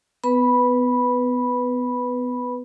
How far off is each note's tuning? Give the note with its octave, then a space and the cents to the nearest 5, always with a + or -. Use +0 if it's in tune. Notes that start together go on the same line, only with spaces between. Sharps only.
B3 +20 B4 +0 B5 -10